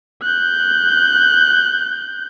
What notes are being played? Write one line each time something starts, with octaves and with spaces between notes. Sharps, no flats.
F#6 G6